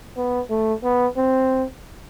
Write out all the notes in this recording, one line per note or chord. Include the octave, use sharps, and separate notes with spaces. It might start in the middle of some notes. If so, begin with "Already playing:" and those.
B3
A3
B3
C4